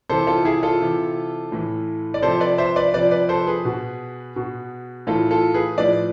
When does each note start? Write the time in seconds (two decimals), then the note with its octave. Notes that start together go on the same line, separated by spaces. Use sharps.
0.09 C3 E3 A4 C5
0.27 F4 A4
0.45 E4 G#4
0.63 F4 A4
0.80 C3 E3
1.52 A2 E3
2.14 D5
2.22 C3 F3 A4 C5
2.40 B4 D5
2.58 C5 E5
2.76 B4 D5
2.94 C3 F3 B4 D5
3.11 B4 D5
3.29 A4 C5
3.47 G#4 B4
3.65 B2
4.36 B2
5.07 A2 E3 F4 A4
5.31 F4 A4
5.54 G#4 B4
5.78 A2 F3 B4 D5